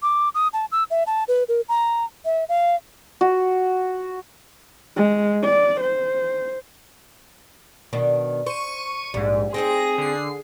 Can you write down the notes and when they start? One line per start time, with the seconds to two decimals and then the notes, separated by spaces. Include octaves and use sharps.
0.02 D6
0.35 D#6
0.53 A5
0.72 E6
0.91 E5
1.07 A5
1.28 B4
1.49 A#4
1.69 A#5
2.25 E5
2.49 F5
3.21 F#4
4.96 G#3
5.43 D5
5.81 C5
7.93 B2 D#3 D4
8.46 C5 C#6 D#7
9.14 A#1 G#2 G3
9.54 C4 D#4 G#4 C5 A#6
9.98 D3 C7